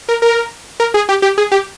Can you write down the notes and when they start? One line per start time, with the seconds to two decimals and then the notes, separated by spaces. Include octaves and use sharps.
0.09 A#4
0.22 A#4
0.80 A#4
0.94 G#4
1.09 G4
1.22 G4
1.38 G#4
1.52 G4